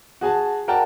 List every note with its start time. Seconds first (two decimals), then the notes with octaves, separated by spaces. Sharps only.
0.21 F#4 G#4 G#5 A5
0.68 F#4 A#4 D5 F#5 G5 A5